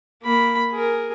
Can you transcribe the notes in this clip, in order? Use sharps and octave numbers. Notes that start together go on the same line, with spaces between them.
A#3 B5
G#4 A#4